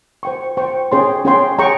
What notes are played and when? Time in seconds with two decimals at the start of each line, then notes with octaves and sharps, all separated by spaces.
0.23 C5 G5 C#6
0.57 C5 G5 C#6
0.92 C#4 G#4 C#5 G5 C6
1.25 C#4 G#4 C#5 G5 C6
1.58 G#4 C#5 G5 A#5 C#6